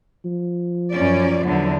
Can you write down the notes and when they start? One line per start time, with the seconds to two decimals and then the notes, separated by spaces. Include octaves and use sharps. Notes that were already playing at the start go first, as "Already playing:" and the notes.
0.25 F3
0.92 F#2 C#4 D5
1.42 E2 D3 F#3